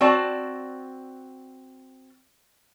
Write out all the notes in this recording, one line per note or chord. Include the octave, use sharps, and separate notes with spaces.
C4 F#4 D5 A5